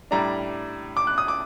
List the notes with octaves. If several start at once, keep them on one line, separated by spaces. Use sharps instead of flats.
A2 G3 D4 A#5
D6
F#6
D#6
D6